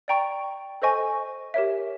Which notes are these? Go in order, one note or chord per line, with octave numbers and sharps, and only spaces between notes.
D5 G5 A#5 C#6
A4 C5 D#5 G#5 C#6
G4 A#4 C#5 E5